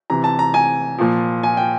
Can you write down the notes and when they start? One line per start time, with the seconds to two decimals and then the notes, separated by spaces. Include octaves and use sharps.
0.10 C3 E3 A#5
0.24 A5
0.39 A#5
0.54 G#5
0.98 A#2 F3
1.43 G#5
1.57 G5